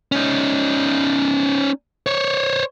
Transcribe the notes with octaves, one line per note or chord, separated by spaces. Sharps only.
C#4 D#4
C5 C#5